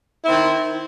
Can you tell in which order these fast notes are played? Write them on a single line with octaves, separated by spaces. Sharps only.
E4 C4 D#3